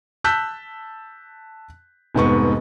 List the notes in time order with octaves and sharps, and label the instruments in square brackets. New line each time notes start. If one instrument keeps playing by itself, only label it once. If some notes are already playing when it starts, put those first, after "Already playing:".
[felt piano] A5 E6 F#6 G6 B6
F1 G#2 B3 C#6